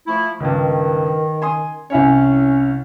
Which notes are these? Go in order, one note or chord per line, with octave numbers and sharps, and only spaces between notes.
F3 A3 E4
C#2 G2 D#3
G#5 C6 D#6
C2 C#4 E4 C#5